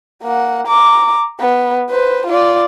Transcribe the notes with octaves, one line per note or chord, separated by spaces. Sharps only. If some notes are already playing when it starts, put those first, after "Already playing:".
A#3 F#5
A#5 D6
B3
B4 C5
F4 D5